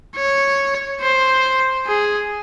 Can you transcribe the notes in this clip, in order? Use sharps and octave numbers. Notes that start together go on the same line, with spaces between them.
C#5
C5
G#4